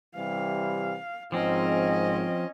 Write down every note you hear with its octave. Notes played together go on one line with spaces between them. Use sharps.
C3 E3 G3 F5
G#1 G#2 F3 C4 C#4 D#5